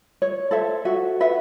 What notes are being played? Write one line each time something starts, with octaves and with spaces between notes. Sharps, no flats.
C#5
A4 C5 E5
F#4 E5
B4 E5 F#5